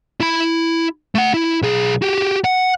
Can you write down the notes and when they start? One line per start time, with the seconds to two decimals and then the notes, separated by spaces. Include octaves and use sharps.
0.20 E4 B5
1.15 A3 F#5
1.34 E4
1.62 B1 G#4
2.02 F#4 G4
2.44 F#5